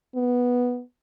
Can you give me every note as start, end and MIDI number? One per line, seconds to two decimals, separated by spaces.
0.15 0.82 59